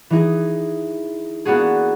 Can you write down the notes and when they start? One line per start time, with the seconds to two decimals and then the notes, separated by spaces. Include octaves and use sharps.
0.10 E3 D#4 G#4
1.45 A#3 B3 D4 F#4 G#4